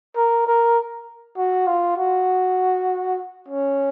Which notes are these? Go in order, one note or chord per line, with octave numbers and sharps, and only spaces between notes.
A#4
A#4
F#4
F4
F#4
C#4